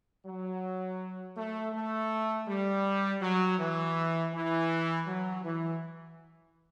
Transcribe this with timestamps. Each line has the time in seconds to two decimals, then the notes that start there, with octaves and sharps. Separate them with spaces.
0.25 F#3
1.37 A3
1.73 A3
2.48 G3
3.21 F#3
3.59 E3
4.33 E3
5.06 F#3
5.44 E3